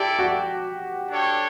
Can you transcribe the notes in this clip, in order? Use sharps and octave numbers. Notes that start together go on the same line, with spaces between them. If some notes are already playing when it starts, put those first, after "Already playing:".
Already playing: E4 G4 A4 D5 G5
F#4
D4 A4 C#5 G5